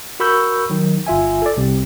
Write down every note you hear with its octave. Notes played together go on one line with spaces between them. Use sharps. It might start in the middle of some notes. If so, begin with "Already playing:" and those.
F#4 A#4 B5 C#6 E6 G6
D#3 F#3
G1 F4 E5 G#5
A4 D5
C2 C3